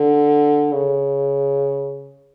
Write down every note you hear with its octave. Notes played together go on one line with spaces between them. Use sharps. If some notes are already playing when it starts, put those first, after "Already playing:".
Already playing: D3
C#3